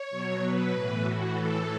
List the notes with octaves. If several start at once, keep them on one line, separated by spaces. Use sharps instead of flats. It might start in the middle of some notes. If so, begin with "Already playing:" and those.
Already playing: C#5
B2 F#3
B2 F#3 B4
A2 E3
A2 E3 F#4
A2 E3 A4